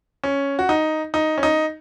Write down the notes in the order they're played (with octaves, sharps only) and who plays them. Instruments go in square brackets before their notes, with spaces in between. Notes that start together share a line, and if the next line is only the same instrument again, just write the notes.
[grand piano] C#4
F#4
D#4
D#4
C#4
D#4